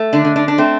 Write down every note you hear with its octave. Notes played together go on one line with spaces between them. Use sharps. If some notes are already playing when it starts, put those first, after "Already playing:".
Already playing: A3
D3 D4
D3
D3 D4
D4
A3 C4